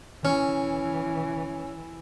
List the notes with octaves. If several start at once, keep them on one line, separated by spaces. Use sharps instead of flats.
E3 C#4